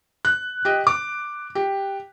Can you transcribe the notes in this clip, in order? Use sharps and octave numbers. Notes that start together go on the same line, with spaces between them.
F#6
G4 D#5
D6
G4